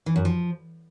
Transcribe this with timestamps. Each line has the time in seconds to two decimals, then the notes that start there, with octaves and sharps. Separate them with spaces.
0.06 E3
0.16 F#2
0.25 F3